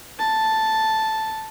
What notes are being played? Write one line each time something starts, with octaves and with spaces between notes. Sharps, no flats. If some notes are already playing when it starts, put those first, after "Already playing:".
A5